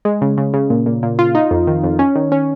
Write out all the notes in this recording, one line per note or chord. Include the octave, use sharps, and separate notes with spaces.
G#3
C#3
C#3
C#3
A#2
A#2
A#2
F4
D#4
F2
D#3
F2
C#4
D#3
C#4